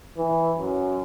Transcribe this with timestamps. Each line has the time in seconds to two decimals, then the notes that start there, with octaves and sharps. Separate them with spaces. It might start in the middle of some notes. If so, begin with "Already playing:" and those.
0.18 E3
0.59 F#2